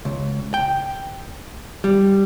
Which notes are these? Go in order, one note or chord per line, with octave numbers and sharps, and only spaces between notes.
C#2
G5
G3